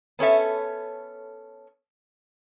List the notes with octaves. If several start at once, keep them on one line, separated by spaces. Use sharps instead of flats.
B3 C#4 A4 E5